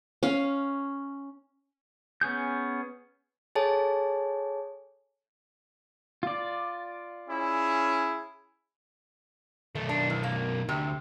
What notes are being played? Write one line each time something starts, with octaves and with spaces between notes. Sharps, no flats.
C#4 F5
B3 C#4 G#4 G6
G#4 A4 C#5 G#5 A5
F4 D5
C#4 E4 G#4
B1 D#3 A3
D4
E2
A#3
D2 C3